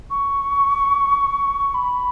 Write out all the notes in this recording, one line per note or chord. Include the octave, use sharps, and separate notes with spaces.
C#6
B5